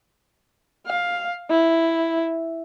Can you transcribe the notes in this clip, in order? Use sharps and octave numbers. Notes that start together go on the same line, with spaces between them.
F5
E4